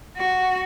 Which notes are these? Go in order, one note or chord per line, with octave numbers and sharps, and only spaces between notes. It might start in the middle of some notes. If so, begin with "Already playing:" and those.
F#4